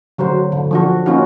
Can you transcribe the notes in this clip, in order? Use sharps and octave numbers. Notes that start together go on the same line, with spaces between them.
D3 F#3 F#4 C5
D3
F3 D4 F#4
A#3 C#4 D#4 F4 F#4